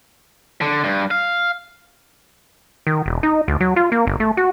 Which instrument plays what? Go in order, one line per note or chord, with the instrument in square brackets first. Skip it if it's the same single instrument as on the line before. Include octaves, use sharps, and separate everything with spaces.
[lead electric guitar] D3
G2
F5
[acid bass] D#3
E1
D#4
D2
F#3
F4
A#3
G1
A3
F#4